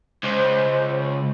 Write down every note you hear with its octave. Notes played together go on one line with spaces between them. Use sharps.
C#2 C5